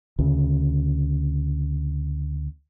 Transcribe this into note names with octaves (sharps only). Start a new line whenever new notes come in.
D2 C#3